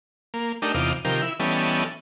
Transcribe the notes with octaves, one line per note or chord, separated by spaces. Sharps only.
A#3
A3 D4 D#4 G4 A#4
E2 C3 D#4 F4 D6
C3 D#3 F3 G4 A#4
E4
E3 G3 B3 C#4 A4 D#5